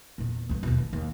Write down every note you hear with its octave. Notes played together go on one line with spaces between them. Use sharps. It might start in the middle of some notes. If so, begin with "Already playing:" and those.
E2 A#2
D2 G2
D#2 B2
B3
D#2